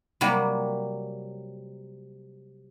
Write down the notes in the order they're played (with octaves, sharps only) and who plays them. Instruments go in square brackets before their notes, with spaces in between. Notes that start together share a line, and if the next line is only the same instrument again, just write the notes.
[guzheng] C3 F#3 G3 A#3